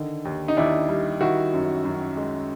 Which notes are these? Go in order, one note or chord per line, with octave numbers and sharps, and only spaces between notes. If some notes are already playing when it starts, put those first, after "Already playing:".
Already playing: D3 D#3
D#2
D#4
D#2 D4 E4
G3
D#3 E4 F#4
F#2
F#2
G#3